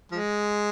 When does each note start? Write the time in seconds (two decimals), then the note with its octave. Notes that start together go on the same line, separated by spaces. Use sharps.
0.12 F3 G#3